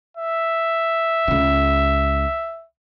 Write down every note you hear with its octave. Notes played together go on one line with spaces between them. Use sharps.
E5
C#2 C#3